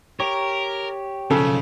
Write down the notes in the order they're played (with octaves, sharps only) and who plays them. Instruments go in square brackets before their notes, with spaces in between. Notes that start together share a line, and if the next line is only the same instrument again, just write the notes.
[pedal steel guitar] G4 C#5 [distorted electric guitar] A#4
[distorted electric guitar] B1 F3 [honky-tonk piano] C#3 [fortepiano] A4